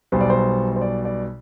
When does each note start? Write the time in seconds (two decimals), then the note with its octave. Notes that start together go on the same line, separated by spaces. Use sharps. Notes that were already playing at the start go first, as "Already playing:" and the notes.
0.12 B1 B2 G3 C5
0.21 D5
0.30 C5
0.76 C5
0.82 D5
1.05 D5